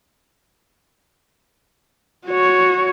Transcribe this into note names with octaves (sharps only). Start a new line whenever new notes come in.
F#4 C#5